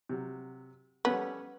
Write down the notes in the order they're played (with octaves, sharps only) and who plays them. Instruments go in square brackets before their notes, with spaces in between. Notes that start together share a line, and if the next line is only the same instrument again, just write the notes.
[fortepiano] C3 F#3
[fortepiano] G3 C#4 A4 [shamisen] B3